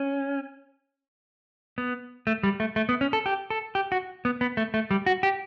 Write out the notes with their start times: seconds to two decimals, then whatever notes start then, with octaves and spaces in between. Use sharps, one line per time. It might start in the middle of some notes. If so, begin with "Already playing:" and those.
Already playing: C#4
1.78 B3
2.27 A3
2.43 G3
2.60 A3
2.76 A3
2.89 B3
3.01 C#4
3.13 A4
3.26 G4
3.50 A4
3.75 G4
3.92 F#4
4.25 B3
4.41 B3
4.57 A3
4.74 A3
4.91 G3
5.06 F#4
5.23 G4